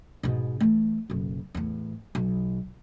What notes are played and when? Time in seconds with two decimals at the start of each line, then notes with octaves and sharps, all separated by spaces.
0.23 G#2 B2
0.60 E3 A3
1.10 F#1 B1
1.55 E2 A2
2.15 B1